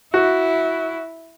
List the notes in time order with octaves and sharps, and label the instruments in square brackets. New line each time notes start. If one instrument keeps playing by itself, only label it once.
[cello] E4 [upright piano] F#4